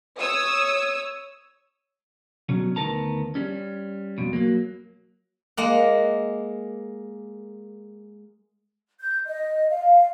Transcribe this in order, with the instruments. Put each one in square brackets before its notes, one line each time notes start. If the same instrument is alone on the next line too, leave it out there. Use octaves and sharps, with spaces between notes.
[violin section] C#5 D#6 E6
[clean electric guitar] B2 F#3 C#4
D2 D#3 B3 A#4 A5 A#5
G3 C#4
F2 B2
F#3 A#3
[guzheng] G#3 A#3 F#5
[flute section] G6
D#5
F5